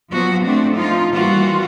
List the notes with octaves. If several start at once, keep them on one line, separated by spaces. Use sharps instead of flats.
F3 F#3 B3 F#4
A3 C4 D4
F3 D#4 F4
E3 G3 A#3 F4 F#4